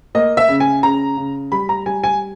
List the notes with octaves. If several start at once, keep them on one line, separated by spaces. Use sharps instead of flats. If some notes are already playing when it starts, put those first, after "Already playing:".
A#3 D#5
E5
C#3
G#5
C#3 A#5
C#3
G3 B5
A#5
G3 G#5
G#5